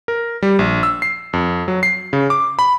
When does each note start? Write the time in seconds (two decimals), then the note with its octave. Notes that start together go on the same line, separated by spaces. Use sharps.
0.08 A#4
0.42 G3
0.59 A#1
0.83 E6
1.02 C7
1.33 F2
1.68 F#3
1.83 C7
2.13 C#3
2.30 D6
2.59 B5